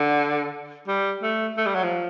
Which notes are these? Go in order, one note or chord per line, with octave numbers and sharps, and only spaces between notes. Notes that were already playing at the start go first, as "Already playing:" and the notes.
Already playing: D3
G3
A3
A3
G3
F#3
F3